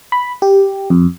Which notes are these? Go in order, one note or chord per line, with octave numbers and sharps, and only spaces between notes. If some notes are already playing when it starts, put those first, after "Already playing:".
B5
G4
F2